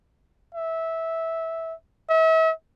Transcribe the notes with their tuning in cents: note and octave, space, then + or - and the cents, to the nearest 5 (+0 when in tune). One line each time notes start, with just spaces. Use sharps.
E5 -15
E5 -40